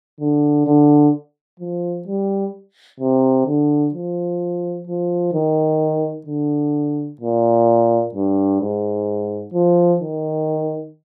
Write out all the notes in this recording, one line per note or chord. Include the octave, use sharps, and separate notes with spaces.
D3
D3
F3
G3
C3
D3
F3
F3
D#3
D3
A#2
G2
G#2
F3
D#3